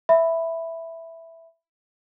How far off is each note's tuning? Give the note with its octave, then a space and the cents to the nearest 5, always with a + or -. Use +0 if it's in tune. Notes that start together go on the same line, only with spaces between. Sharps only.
E5 +0 B5 +5